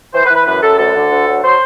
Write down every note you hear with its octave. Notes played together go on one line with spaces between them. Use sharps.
E3 C5
B4
E3
B4
F#2 B4
F#2 A4
D2 A4
D3
D2
F#3
F#3 C5